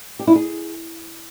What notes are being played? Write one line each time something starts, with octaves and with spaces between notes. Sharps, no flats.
G4
E4
G#4